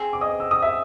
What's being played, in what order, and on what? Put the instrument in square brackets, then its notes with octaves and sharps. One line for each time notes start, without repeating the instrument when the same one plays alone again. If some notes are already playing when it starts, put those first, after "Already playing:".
Already playing: [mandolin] C4 G#4
[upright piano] D6
D#5 D#6
E6
D#6
E5 E6